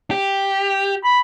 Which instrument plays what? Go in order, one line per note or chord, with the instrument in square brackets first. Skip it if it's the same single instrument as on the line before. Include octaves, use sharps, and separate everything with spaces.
[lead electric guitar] G4
[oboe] B5